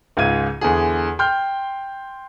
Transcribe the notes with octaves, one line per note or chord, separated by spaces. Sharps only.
C#2 G#2 F4 G#6 D#7
E2 D3 G#4
G5 C6 F6 G6